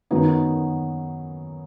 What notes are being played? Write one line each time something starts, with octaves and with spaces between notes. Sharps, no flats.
F#2 D#3 F#3 B3 D#4